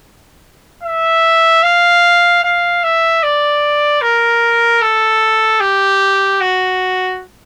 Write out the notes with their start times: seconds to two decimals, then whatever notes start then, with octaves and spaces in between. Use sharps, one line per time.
0.83 E5
1.63 F5
2.44 F5
2.83 E5
3.23 D5
4.02 A#4
4.82 A4
5.61 G4
6.41 F#4